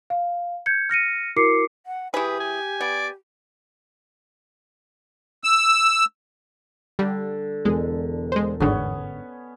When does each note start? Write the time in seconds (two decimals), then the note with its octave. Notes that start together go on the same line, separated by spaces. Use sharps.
0.10 F5
0.66 G6 G#6 C#7
0.90 F6 A#6 C#7 D#7
1.36 E4 F#4 A#4 D6 C7 C#7
1.86 F#5
2.14 E3 G4 G#4 B4
2.40 G#5
2.81 B3 D5
5.44 E6
6.99 D3 G3
7.65 E1 G#3
8.32 G#3 C5
8.60 G1 G#2 D3 B3 C#4